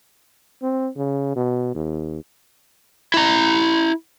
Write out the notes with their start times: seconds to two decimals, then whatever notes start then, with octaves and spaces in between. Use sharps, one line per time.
0.62 C4
0.96 C#3
1.36 B2
1.75 D#2
3.14 E4 A#5